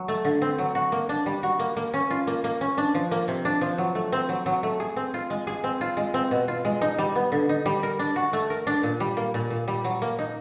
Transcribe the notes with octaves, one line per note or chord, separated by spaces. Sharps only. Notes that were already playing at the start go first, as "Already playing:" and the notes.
Already playing: F#3
A3
D3
C4
F#3
F#4
A#3
D4
G3
F#4
A#3
A#3
C#4
F4
A#3
A#3
C#4
D4
F3
A#3
C3
D4
F3
F#3
A3
C4
F#3
F#3
A3
G#4
C4
F4
G#3
G#4
C4
F4
G#3
C4
B2
F4
G#3
D#4
G3
B3
D3
D#4
G3
A#4
D4
F#4
A3
A#4
D4
A#2
G3
A#3
A#2
A#2
G3
F#3
A#3
D#4